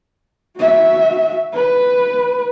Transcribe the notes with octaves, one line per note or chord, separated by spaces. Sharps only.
F#4 E5
B4